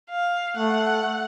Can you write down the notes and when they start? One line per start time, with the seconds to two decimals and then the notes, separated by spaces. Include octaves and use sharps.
0.10 F5
0.57 A3 F#5